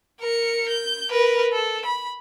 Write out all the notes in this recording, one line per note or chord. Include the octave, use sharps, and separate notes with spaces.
A#4 C#7
G6
A#4 B4
A4
B5